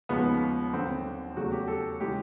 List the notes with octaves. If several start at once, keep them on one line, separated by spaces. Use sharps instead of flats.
D#2 C#3 F3 G#3 B3
D#2 D3 F#3 C4
E2 C#3 F#3 A3 F#4
G4
A4
C#3 E3 G#3 G4